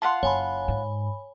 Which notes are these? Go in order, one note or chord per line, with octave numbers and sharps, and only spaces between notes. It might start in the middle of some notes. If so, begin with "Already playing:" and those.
F4 F5 F#5 A5 C6
F#1 C#5 G#5 B5
G#2